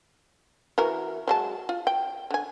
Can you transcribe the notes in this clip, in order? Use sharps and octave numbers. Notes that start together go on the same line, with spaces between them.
E3 F#4 A#4
F#3 G#3 A5
F4
G5
D3 G#5